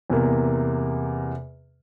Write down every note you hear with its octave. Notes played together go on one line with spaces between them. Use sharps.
E2 C3 A#3